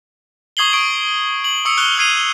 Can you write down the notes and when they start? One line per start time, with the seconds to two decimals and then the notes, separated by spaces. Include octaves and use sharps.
0.57 C#6 D#6 G#6 C7 F#7 G7
0.73 C#6 D#6 D7
1.44 F#7
1.65 C#6 D#6 E6 C#7
1.78 C#6 F6 F#6 F7 G7
1.98 D#6 G#6 C7 D#7 F7